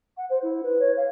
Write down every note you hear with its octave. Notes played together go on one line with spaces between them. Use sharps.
F#5
C5
E4
B4
C#5
F5